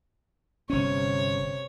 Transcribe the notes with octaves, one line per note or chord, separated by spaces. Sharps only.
G1 C3 C#4 C#5